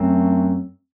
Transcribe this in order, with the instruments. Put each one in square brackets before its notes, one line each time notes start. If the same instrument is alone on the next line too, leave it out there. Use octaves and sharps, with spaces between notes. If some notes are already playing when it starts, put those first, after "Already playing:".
Already playing: [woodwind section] F#2 F#3 A3 C4